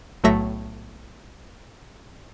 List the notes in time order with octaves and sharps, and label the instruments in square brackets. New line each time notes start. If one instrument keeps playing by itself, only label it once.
[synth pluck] B1 A2 F#3 A3 E5 A#6